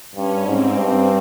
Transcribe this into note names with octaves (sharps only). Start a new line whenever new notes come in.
G2 C#4
G#2 C4
G2 C4